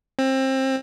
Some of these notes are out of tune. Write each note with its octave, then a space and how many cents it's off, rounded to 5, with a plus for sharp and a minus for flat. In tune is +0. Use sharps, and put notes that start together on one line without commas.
C4 +25